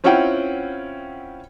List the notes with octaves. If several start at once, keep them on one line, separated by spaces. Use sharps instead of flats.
C4 C#4 E4 F4 F#5 G5